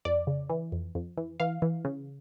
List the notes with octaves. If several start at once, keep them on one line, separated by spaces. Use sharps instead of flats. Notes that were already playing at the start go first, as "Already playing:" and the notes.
F2 D5
C#3
E3
F2
F2
E3
E3 F5
E3
C#3